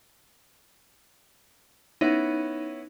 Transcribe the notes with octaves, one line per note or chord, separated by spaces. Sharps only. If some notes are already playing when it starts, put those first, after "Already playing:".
B3 C#4 D#4 E4